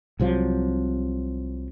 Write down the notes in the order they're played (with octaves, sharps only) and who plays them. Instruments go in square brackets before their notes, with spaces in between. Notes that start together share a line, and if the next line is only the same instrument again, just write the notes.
[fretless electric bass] C2 C3 F3 F#3